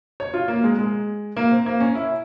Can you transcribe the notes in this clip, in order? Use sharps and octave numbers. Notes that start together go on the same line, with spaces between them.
C#5
F4
A#3
G#3
G#3
A#3
C4
A#3
C#4
E4